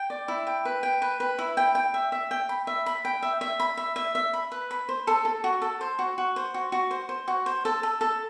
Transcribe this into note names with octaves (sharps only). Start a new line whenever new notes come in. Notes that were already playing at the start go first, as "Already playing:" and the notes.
Already playing: G5
D5
E4
G5
B4
G5
B4
B4
E4
G5
G5
E5
E5
G5
B5
E5
B5
G5
E5
E5
B5
E5
E5
E5
B5
B4
B5
C5
A4
A4
F#4
A4
C5
F#4
F#4
C5
F#4
F#4
C5
C5
F#4
C5
A4
A4
A4